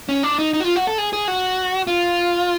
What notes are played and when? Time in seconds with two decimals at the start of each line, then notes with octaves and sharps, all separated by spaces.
0.09 C#4
0.23 D4
0.39 D#4
0.54 D#4
0.60 F#4
0.65 F4
0.76 F#4
0.87 A4
0.98 G#4
1.13 G#4
1.28 F#4
1.87 F4